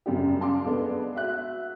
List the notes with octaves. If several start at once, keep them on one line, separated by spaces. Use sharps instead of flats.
F#2 C#3 G3 D4 G4
F5 A5 C6 D6
G#3 B3 D4 A4
F#4 E5 F#6